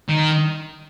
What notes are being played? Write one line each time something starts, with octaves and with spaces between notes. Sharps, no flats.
D#3